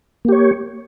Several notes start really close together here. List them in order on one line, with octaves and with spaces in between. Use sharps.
A#3 G4 C#5